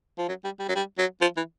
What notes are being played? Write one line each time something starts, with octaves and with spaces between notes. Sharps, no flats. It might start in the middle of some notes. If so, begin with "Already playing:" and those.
F3
F#3
G3
G3
F#3
G3
F#3
F3
E3